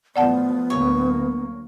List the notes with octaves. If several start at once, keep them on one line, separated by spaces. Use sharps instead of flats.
A2 F3 B3 D5 F#5 A5
D2 F#3 A#3 C#5